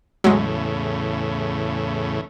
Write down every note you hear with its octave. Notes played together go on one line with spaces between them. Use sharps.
E2 A2 C#3 F#3 G#3